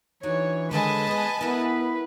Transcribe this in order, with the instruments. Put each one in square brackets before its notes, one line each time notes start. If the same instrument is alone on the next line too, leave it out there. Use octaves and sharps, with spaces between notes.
[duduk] E3 [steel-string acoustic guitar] D4 D#4 F#4 [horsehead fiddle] C#5
[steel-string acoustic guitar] D3 D#3 A4 [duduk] G#3 [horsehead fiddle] B4 [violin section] D#5 G#5 A5
[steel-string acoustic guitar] B3 G#4
[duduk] B3 [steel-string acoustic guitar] E4 A#4 F#5 [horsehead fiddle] B4